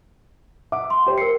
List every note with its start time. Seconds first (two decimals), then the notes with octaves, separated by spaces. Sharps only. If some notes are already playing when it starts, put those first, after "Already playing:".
0.72 E5 F#5 D6
0.90 C6
1.06 G4 C5 G5
1.18 A#4 C7 C#7